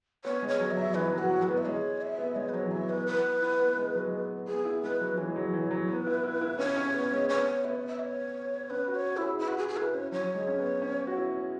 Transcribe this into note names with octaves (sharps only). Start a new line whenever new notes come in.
B3 C#5
G#3
C#5
F#3
E5
F#3
E3 B4
F#3 F#4
F#3
B4
B3
E5
G#3 C#5
E5
B3
B3
G#3 C#5
B4
F#3 C#5
E3
F#3 E5
B3 B4
E4 B4
E4
B3
G#3
F#3
G#3
B3
B3 G#4
E4
G#3 B4
F#3
E3 C#5
G#3
F#3
E3
F#3
B3 B4
E4
E4
E4
C#4 C#5
C#4
B3
G#3
B3 C#5
B3 E5
C#5
E5
C#5
C#4 B4
F#4
C#5
F#4
E4
G#4
E4 B4
F#4
F#4 G#4
G#4
E4 B4
C#4 C#5
F#3 C#5
G#3
C#4
B3
C#4
F#4
E4